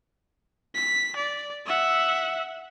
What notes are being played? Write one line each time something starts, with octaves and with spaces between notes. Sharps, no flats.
B6
D5
E5 F#5